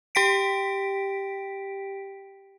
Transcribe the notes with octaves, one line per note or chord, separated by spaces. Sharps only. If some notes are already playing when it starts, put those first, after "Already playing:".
G4 G5 B6 D7